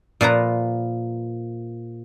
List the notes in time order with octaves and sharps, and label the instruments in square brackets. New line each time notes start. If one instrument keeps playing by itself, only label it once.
[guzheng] A#2 F3 B4 A#5